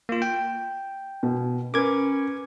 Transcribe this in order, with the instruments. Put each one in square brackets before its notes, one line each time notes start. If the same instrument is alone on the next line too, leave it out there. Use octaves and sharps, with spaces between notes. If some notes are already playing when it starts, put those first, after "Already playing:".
[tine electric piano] A#3 F4
G5
[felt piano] B2
[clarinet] C#4 [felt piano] A#4 B4 [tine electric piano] D6 G#6